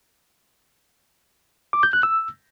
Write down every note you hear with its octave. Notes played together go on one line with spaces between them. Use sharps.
D6
G6
F#6
E6